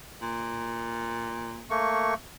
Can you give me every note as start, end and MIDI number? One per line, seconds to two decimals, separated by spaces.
0.22 1.63 46
1.70 2.14 57
1.70 2.14 58
1.70 2.14 85